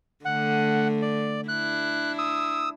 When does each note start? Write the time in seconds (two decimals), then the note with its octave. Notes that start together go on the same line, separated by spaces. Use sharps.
0.25 D3 A3 F#5
1.02 D5
1.48 D4 E4 F#6
2.18 D#6 E6